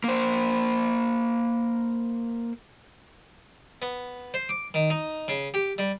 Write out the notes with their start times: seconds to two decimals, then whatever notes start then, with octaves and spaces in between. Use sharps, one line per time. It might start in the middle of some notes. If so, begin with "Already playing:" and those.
0.04 A#3 C5
3.82 B3
4.34 C5
4.49 D6
4.74 D#3
4.90 D#4
5.28 C#3
5.54 G4
5.78 G3